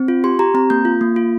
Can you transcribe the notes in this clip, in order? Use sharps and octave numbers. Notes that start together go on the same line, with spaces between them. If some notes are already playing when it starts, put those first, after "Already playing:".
Already playing: C4
F4
G4 C6
G4 A#5
C4 A#5
A#3 G6
F4
A#3
F4